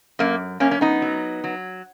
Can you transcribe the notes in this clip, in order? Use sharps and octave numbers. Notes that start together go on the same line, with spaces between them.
F#2 A#3
F#2 A#3 C#4
C#4
B3 D#4
F#3
F#3